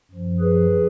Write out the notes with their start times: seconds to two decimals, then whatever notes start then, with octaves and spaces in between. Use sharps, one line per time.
0.11 F#2 F3
0.40 G#4 B4